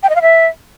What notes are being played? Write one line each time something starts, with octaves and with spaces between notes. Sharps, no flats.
G5
D#5
F5
E5